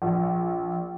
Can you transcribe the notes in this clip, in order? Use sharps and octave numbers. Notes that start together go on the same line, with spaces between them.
A#1